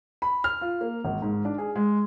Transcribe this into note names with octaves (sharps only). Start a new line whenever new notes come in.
B5
F6
F4
A#3
G#1
G#2
D4
G#4
G#3